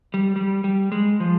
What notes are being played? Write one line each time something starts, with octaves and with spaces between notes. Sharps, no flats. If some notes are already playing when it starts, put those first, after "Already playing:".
G3
G3
G3
G#3
F3